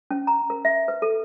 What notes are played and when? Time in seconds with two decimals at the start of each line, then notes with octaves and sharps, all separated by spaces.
0.11 C#4
0.27 A#5
0.50 A#4
0.65 E5
0.88 B4
1.02 A4